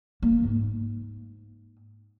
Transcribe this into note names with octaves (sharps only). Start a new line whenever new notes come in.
A#3
G#2